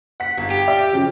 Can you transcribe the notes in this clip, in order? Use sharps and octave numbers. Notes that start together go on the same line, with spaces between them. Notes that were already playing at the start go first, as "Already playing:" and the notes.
F#5 B6
G1
G4
D5 E5 F5
D7
C#3 F3 F#3